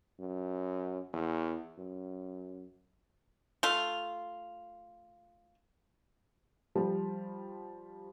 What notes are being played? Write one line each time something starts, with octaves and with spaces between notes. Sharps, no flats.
F#2
E2
F#2
A3 F4
F3 G3